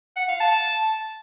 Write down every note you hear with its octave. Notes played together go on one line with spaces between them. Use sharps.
F#5
F5
A5